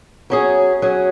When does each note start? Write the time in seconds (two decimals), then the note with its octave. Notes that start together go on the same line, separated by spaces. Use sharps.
0.30 F#3 C#4 G#4
0.82 F#3 C#4 G#4